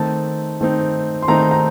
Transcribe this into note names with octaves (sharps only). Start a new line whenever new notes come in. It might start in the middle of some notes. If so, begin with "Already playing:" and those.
Already playing: D#3 A3 C4 D#4 A5
D#3 A3 C4 D#4
C6
D#3 A3 C4 D#4 A#5
A#5